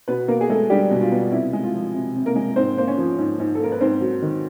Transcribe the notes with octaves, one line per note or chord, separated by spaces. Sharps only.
B2 B3 B4
A#3 B3 A#4
G#4
G#3 A3 A4
G3 D4 G4
B2
F4
B3
C3 E4
G#3
F4
F3
C3
C3
A#3 A#4
G#3
G#2 C4 C5
A#3 C5
C#4 C#5
F3
G#2
G#2
A4
A#3 A#4
B4
G#2 C4 C5
F#3
D#3